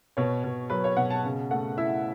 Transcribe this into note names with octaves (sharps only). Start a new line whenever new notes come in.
B2 C#5
B2
F#3 B4
C#5
B2 F#5
A5
C#3
A3 F#5
E4 E5